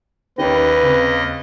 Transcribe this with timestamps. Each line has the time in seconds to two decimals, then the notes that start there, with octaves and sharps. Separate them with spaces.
0.38 D#2 D#3 C#4 G4 B4 D#5
0.82 C#3 C4